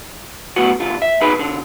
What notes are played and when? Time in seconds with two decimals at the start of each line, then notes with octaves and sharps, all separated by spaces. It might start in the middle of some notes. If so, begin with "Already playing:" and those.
0.56 B1 A2 B3 F#4
0.80 D2 G2 F4
1.02 E5
1.21 B2 D#4 G#4 B4 B5
1.39 B2 D3